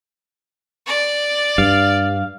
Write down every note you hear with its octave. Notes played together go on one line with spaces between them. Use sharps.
D5
G2 F5